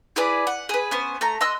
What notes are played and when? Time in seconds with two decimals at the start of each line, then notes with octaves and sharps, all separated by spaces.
0.16 E4 G#4 B4 D5
0.47 F#5
0.69 G#4 B4
0.91 B3 C#4 C5
1.21 A3 A#5
1.41 D#5 C6 E6 F#6